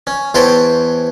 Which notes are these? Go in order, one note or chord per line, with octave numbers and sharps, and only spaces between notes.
C#4
E2 C5 C#5 G5 A5 B5